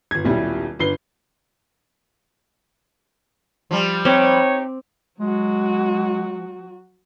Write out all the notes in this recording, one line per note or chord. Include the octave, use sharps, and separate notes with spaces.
G1 G#6
D#1 B1 G3 E4
G1 D4 B4 C7 G7
F3 G3
C4 D#4 G4 C#5
F#3 G#3 F#4